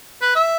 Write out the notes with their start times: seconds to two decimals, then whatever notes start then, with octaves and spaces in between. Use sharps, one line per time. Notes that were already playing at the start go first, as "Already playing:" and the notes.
0.22 B4
0.35 E5